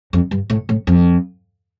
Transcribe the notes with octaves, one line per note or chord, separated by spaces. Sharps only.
F2
G2
A2
A2
F2